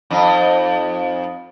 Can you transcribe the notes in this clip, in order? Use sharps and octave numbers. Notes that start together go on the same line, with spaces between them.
F2 D#4